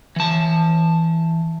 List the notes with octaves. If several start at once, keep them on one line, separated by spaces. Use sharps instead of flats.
E3 A5